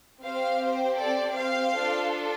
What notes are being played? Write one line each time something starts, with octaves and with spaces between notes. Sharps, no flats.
C4 G4 C5 F5
C5
A4 D5
C5 F5
D4 F4 A4